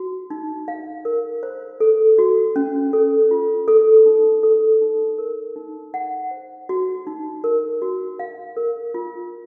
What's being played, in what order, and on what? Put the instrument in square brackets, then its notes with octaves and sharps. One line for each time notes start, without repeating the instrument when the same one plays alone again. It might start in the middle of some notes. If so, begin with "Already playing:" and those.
Already playing: [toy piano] F#4
D#4
F5
A#4
C5
A4
F#4
C#4
A4
F4
A4
D#4
A4
D#4
A#4
D#4
F#5
C5
F#4
D#4
A#4
F#4
F5
A#4
F4